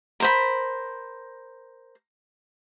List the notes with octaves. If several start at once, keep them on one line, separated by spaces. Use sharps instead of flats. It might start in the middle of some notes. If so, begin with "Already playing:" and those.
A#4 C5 B5